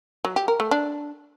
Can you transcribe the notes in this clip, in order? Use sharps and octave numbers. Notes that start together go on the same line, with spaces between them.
F#3
G4
A#4
A3
D4